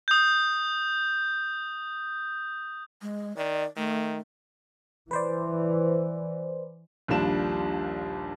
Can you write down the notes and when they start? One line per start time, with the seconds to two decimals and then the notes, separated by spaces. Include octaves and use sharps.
0.08 D#6 G6
3.02 G#3
3.37 D#3 D5
3.77 D#3 A3
5.11 E3 B4 C5 D5
7.08 A#1 D#2 A#2 G3 D4 E7